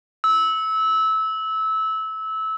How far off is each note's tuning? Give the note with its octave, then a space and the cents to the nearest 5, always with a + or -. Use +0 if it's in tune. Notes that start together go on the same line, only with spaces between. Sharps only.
E6 -20